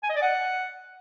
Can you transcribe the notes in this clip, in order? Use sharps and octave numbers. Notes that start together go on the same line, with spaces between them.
G#5
D#5
D5
F#5